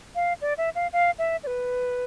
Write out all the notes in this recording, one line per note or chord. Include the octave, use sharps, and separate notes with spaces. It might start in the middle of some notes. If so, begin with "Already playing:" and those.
F5
D5
E5
F5
F5
E5
D5
B4